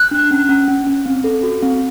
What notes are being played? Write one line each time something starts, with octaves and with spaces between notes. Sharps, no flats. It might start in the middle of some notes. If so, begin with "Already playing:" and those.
Already playing: F#6
D4
C#4
C#4
C#4
C#4
C4
A4
F#4
C4